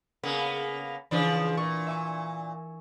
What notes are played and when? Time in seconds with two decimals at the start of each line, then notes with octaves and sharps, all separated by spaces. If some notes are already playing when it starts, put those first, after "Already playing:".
0.23 C#3 A#3 B3
1.11 C#3 E3 F3 D4
1.57 A#2 C#6
1.87 E5 G#5 C#6